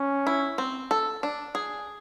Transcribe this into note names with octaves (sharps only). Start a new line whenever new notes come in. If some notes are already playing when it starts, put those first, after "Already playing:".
Already playing: C#4
E4
C4
A4
D4
G#4